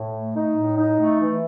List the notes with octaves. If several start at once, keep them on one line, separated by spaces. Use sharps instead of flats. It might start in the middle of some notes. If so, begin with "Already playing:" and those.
Already playing: A2
A3
D#4
A2
D#4
A3
E3